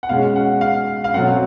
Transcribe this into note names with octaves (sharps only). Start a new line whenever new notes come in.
F#5
B2 G#3 C#4 F5
F#5
F5
F5
B2 F#3 A3 C4 F#5